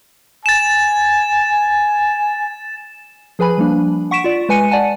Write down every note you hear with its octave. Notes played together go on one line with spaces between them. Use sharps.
G#5 A6 E7
F3 G#4 B4 G#5 B5
F3 G3 A#3 D4
F#5 C#6 B6 D7 E7
F4 D5
G#3 B4 G#5 C#7 D#7
D5 F#5 G#5 A5